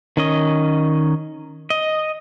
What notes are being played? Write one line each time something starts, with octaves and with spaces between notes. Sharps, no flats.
D#3 C#4 D#5
D#5